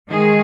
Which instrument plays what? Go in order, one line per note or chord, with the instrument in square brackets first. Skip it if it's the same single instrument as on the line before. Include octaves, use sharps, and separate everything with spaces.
[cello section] D#3 G#3 G#4